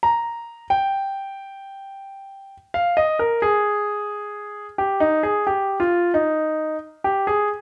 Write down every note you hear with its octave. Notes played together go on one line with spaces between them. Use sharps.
A#5
G5
F5
D#5
A#4
G#4
G4
D#4
G#4
G4
F4
D#4
G4
G#4